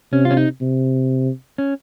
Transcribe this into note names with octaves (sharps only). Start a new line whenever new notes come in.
C3 C#4
F4
C#4
D#4
C3
C#4